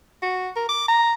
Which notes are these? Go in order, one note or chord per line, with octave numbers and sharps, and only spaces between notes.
F#4
A#4
D6
A#5